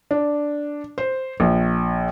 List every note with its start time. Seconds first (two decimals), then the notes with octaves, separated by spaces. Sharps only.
0.11 D4
0.98 C5
1.40 A#1